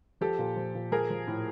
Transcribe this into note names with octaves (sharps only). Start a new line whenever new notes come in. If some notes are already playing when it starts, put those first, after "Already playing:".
F3 G4 A4
A#2
F3
A#2
F3 G#4 A#4
F3
A2